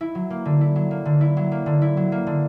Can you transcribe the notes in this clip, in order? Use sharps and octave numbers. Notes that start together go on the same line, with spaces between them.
E4
F#3
A#3
D3
E4
F#3
A#3
D3
E4
F#3
A#3
D3
E4
F#3
A#3
D3